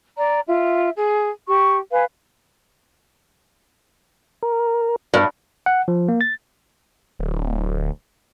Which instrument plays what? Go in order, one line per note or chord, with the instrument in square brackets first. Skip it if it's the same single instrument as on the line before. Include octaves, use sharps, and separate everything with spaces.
[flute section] D5 A#5
F4 E5
G#4
G4 C#6
B4 F5 G#5
[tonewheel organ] A#4
[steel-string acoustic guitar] G2
[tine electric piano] F#5
F3
A#3
A6
[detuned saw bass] D1